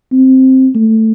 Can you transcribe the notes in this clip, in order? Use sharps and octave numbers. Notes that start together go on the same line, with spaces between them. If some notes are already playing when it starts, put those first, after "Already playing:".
C4
A3